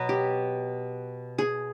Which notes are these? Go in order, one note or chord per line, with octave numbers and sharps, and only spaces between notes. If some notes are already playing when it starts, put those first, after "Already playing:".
Already playing: B2 F#3 B3
G4
G#4